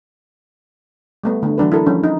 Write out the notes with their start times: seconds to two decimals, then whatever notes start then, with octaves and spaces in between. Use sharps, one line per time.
1.24 G3 A3 B3
1.43 D3 A3
1.58 E3 F#3 D4 B4
1.72 E4 A4 A#4
1.86 F3 G3 C#4 D4
2.04 D#4